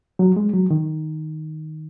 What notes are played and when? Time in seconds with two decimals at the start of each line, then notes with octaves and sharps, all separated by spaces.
0.19 F#3
0.36 G#3
0.54 F#3
0.70 D#3